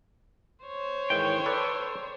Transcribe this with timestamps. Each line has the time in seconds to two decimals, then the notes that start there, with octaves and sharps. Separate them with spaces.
0.65 C5 C#5
1.10 G#2 D#3 E3 G5
1.46 A4 B4 D5